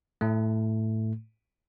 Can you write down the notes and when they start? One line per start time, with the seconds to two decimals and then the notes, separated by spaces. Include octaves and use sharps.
0.21 A2 A3